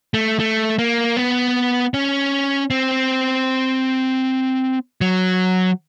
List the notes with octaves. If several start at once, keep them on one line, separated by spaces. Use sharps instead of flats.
A3
A3
A#3
B3
C#4
C4
F#3